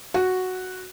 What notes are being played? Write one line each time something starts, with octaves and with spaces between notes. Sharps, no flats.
F#4